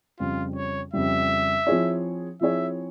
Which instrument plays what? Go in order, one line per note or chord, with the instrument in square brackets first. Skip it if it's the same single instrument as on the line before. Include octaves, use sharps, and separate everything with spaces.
[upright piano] F2 C#3 G3 [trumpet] F4
[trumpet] C#5
[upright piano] F2 C#3 G3 [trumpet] E5
[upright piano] F3 C4 E4 G#4 C#5
[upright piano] F3 C4 E4 G#4 C#5 [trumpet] E5